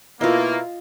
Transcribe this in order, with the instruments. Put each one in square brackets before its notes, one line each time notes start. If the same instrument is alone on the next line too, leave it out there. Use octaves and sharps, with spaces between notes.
[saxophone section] B2 E4 [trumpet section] A#3 [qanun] F4 D#5